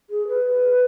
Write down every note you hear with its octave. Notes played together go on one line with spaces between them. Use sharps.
G#4
B4